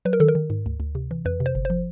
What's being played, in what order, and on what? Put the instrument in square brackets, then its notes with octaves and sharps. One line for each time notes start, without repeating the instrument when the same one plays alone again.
[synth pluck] F#3 B4
A#4
D#3 A4
A#4
D#3
G#2
D2
D2
C3
E3
F2 B4
C3
C5
G1
F3 C5